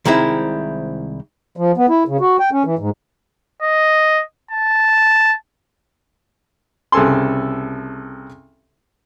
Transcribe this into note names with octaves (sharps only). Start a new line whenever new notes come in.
C2 D#3 G#3 C4 E4
F3
B3
E4
C#3
F#4
G5
C#4
E3
G#2
D#5
A5
C2 C#3 A4 G#5 C6